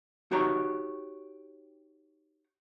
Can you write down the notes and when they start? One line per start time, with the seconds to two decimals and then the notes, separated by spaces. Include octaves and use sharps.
0.31 D#4 F#4 G4 C#5 G5 A#5